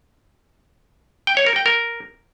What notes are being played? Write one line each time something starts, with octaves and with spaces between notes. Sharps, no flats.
G5
C#5
A#4
G5
A#4